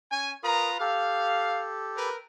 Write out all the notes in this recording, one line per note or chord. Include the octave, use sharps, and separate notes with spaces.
C#4 G#5
F4 A#4 B4 A#5 D#6
G4 A4 F5
A#4 B4